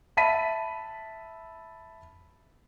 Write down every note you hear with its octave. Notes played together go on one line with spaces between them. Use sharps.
E5 A5 B5 B6 D#7